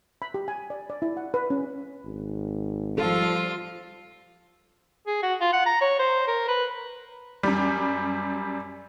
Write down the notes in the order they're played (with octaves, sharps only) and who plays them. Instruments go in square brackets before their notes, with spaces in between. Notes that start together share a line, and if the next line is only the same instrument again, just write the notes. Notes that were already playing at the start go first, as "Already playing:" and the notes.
[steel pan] B5
G4
G#5
D5
D5
E4
F#5
B4
C#4
[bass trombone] G#1
[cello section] F3 G3 [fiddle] F4 [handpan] A4
[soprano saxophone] G#4
F#4
F4
F#5
A#5
C#5
C5
A#4
B4
[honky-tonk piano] F#2 G3